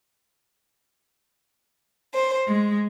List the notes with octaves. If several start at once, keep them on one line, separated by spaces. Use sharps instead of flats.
C5
G#3